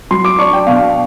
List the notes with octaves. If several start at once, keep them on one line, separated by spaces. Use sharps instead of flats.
F#3 C6
D6
D4 C#6
G5
B2 F5